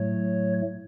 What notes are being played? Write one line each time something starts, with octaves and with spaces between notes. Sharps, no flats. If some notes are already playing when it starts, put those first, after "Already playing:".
Already playing: A2 F#3 A3 C#5